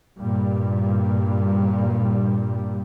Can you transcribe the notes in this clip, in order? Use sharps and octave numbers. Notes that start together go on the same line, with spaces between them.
G2 A#2 G3